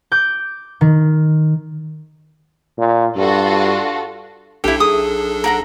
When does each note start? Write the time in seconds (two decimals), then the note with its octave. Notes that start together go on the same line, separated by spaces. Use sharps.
0.12 D6 G6
0.81 D#3
2.78 A#2
3.16 G2 F4 F#4 A4
4.64 B1 D4 E4 G4 A4
4.80 G#4 D#6
5.44 A#4 F#5 A#5